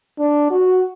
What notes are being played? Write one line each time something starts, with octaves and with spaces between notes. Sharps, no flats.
D4
F#4